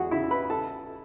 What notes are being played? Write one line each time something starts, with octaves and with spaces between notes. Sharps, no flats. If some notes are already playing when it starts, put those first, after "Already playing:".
Already playing: E2 F#4 G#4 F#5
C#3 E4 E5
B4 B5
A4 A5